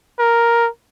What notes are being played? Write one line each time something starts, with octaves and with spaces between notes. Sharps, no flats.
A#4